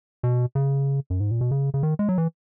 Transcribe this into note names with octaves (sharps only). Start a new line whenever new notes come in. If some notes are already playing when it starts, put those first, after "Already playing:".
B2
C#3
F#2
G#2
A#2
B2
C#3
C#3
D#3
G#3
F#3
E3